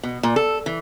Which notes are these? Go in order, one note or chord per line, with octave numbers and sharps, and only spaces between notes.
B2
A#2
A4
E3